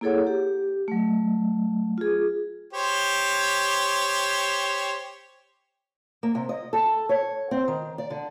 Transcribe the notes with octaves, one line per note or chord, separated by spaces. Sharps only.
A#3 E4 G#4 A4 C#5 F#5
G4
F#3 A3
F4 G#4
G4 C5 C#5
A#3
C3
D#5
A4
C#5
C4
D#3
D5
D3